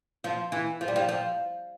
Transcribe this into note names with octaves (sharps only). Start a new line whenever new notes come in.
F3
E3
F3
G3
F3
F3